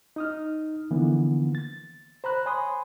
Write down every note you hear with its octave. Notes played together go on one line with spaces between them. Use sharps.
D#4 D#6 F6
D3 E3 F3 A#3 B3
A6
C5 A#5 B5 F#6
C#5 G#5 B5 C6 D#6